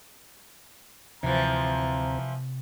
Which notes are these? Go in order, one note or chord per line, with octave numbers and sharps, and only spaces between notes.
D2 C3 E3 F3 C4 A#5